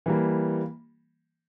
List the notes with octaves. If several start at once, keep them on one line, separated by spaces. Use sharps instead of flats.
E3 G3 A#3